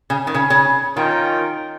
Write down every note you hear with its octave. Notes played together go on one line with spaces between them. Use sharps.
C#3
D#3
C#3
C#3
D#3 C#4 F4 A#4 D#5 G5